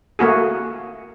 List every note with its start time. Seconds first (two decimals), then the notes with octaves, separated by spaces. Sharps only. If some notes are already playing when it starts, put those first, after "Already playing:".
0.19 A3 A#3 F#4 G#4